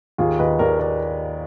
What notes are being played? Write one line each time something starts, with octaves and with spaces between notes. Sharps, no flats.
D#2 F4 G#4
D#2 B4 D#5
D#2 A#4 D5
A#4 D5